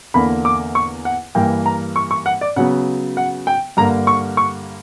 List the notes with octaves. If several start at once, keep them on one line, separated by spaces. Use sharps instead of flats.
E2 D3 A#3 B5
D6
C#6
F#5
G2 E3 A#3 G5
A#5
C#6
C#6
F#5
D5
C#3 F#3 B3 F#5
F#5
G5
G2 D3 A#3 A#5
C#6
C#6